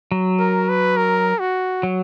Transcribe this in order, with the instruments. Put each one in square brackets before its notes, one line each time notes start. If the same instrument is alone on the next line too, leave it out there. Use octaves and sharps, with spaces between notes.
[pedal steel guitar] F#3
[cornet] A#4
B4
A#4
F#4
[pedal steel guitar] F#3